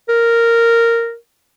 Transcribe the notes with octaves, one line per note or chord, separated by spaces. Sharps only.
A#4